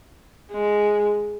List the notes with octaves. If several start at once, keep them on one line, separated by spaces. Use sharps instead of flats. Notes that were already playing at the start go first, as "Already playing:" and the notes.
G#3